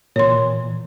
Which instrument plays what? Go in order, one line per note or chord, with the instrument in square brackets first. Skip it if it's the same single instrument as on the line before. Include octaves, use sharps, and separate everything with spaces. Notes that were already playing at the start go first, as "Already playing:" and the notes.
[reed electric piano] A#2 E3 [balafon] C#5 C6